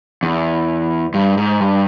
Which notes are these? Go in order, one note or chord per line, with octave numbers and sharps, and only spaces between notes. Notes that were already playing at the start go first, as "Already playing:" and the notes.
E2
G2
G#2
G2